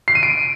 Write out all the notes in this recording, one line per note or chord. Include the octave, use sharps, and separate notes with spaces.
C7
D#7
D7